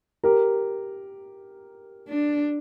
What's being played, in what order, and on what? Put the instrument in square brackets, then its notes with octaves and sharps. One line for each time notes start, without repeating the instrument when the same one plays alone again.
[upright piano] G4 A#4
[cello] D4